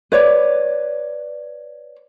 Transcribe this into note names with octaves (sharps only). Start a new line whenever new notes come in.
B4 C#5 D5